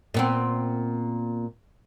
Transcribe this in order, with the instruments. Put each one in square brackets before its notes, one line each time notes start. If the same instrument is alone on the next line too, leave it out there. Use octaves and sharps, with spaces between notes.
[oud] A#2 B3 C4